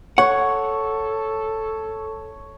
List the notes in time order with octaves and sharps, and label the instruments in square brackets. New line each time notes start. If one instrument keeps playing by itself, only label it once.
[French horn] A4 [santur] C#5 [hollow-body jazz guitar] F#5